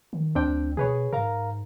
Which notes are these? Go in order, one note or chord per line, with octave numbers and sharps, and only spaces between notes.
D#3
D2 C4 D4 G5
B2 G#4 B4 C#5
G#2 A#4 F5 A#5